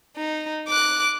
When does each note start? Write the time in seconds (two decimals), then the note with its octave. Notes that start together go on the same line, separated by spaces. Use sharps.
0.16 D#4
0.68 D6 F#6